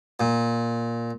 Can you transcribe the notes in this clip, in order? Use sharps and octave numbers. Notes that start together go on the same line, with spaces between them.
A#2